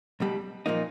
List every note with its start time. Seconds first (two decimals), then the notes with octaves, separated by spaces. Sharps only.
0.20 B1 B2 G3
0.66 A#2 F3 A#3 D#4